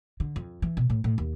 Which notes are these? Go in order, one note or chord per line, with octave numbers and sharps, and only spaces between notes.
D3
F2
E3
B2
A2
A2
D#2